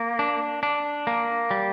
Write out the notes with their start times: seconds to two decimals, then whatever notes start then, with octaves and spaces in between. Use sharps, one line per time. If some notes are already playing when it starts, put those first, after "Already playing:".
Already playing: A#3
0.19 D4
0.63 D4
1.07 A#3
1.51 G3